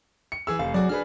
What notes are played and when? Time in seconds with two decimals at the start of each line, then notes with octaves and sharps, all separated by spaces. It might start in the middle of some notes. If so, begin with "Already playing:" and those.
0.32 C#7
0.47 E3 G#4 E6
0.59 F1 F5
0.74 F#3 F#4 G#4 D5
0.89 D4 G#4 B4 F6